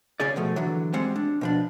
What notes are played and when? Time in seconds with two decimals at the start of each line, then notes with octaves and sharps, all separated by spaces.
0.20 C#3 C#4 G#4 D5
0.36 B2 F3 A3
0.56 D3 E3 F#3
0.93 G3 G#3 C4 F#5
1.16 D4
1.41 B2 F3 D4